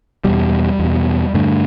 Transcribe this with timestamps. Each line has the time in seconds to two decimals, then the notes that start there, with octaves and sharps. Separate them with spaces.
0.24 E2 B2 G3
0.79 E2
0.84 B2
1.34 G2 D3 A3